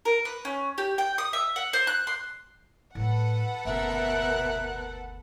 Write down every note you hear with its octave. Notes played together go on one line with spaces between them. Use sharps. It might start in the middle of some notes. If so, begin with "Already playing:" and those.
A#4
B4
C#4
G4
G5
D#6
E5
F#5
C5
F#6
C6
A2 F#3 A4 B4 F#5
F#1 D2 B2 A#4 E5 F#6